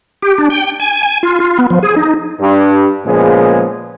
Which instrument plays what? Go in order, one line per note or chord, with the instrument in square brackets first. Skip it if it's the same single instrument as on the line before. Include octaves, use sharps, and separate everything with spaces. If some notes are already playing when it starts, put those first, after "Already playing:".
[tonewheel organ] G4
D4
G5
G#5
G#5
F4
F4
B3
F3
G#4
D#4
[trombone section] G2
A#2 C#3 F3 G#3 B3 G#4